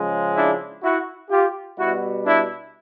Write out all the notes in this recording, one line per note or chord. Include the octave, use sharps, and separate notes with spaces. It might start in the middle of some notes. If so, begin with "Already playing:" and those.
Already playing: C#3 F3 G#3
D4 E4
E4 F#4
F4 G4
B2 G3 E4 F#4
D4 E4